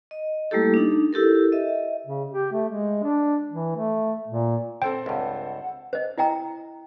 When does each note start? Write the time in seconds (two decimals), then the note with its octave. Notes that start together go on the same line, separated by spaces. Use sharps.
0.11 D#5
0.51 G3 A3 A#3 E4 G4 A4
0.74 D4 D#4
1.13 E4 G4 A4 A#4
1.52 D#5 E5
2.07 C#3
2.31 G4
2.52 A3
2.68 G#3
3.03 D4
3.51 E3
3.76 A3
4.28 A#2
4.82 C4 A4 C5 G5
5.06 C#2 G2 F#5
5.93 C5 D#5
6.18 E4 D#5 G5 A#5